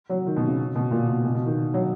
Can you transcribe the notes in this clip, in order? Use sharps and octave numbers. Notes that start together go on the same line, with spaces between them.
F#3
D#3
B2
C#3
B2
A#2
B2
B2
B2
D#3
F#3